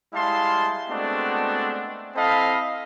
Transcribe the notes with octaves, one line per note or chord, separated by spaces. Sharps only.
G3 G#3 E4 F5 A5 C6
G#3 A3 B3 C4 D4 F#4
C4 E4 A4 D#5 F5 B5